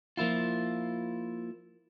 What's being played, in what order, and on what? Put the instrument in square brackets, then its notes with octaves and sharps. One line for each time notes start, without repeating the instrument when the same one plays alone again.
[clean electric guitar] F3 A#3 E4 F4